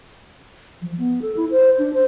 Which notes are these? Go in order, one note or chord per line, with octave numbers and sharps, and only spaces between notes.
F3
B3
A4
E4
C5
D4
C5